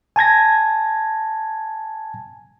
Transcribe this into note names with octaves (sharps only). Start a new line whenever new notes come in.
G#5 A5 G#6 A#6